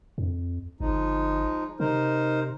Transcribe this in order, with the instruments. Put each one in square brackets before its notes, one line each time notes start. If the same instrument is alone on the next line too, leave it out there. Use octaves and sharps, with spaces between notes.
[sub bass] F2
[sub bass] G1 [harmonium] F3 G#3 D#4
[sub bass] C3 [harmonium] D#4 A#4 C5